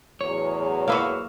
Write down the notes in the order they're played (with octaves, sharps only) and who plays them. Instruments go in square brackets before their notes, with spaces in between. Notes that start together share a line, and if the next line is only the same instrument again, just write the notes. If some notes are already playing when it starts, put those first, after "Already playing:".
[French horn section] E2 A2 F#3 [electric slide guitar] C#5
[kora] A#3 E5 [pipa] F#4 B4 F5